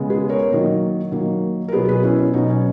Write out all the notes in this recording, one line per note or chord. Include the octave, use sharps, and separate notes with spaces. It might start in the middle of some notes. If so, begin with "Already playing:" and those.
Already playing: C#3 G#3 B3
G#4 B4
A#4 C#5
D#3 F#3 A#3
D#3 F#3 A#3
A#4
B2 F#3 B3 G#4 B4
G#4 B4
C#4 E4
C#4
B2 F#3 B3 D#4
C#4